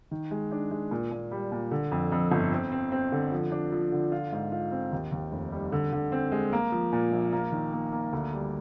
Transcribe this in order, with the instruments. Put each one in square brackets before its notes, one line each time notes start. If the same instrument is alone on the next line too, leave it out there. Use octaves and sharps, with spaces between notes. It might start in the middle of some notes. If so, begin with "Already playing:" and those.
[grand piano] D#3
G#3
D4
G#3
A#2
A#2
G3
A#2
D3
F2
F2
G1
C4
C4
C4
D3
F3
D4
F3
D3
F4
G#2
F4
C4
D#2
D#2
F1
G3
D3
D3
C4
G#3
A#3
F3
A#2
A#1
A#3
D#3
A#3
A#3
D2
G3